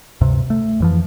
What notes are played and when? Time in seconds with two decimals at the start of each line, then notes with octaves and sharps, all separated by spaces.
0.21 D2 G2 C3
0.50 A3
0.80 F2 E3 F3